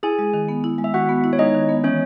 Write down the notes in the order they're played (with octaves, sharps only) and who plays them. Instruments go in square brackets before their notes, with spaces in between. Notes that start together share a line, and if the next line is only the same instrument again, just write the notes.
[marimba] E4 [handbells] G#4 G#5
[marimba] G#3
D#3
B3
E4
G#3
[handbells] E5
[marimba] D#3 [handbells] F#4 F#5
[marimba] B3
E4
[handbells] C#5
[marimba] G#3 [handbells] D#4 D#5
[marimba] D#3
B3
[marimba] E3 [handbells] C#4 C#5